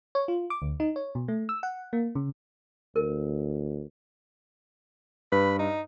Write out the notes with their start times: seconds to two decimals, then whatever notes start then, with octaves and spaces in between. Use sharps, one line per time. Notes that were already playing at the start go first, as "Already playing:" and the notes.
0.15 C#5
0.28 F4
0.50 D6
0.62 D2
0.80 D#4
0.96 C#5
1.15 B2
1.28 A3
1.49 E6
1.63 F#5
1.93 A#3
2.15 C#3
2.96 D2 A#4
5.32 G2 B4
5.59 D#4